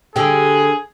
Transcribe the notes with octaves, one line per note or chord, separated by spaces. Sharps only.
D3 G4 G#4